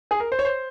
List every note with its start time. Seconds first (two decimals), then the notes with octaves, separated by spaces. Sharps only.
0.11 G#4
0.20 A#4
0.32 C5
0.39 C#5
0.45 C5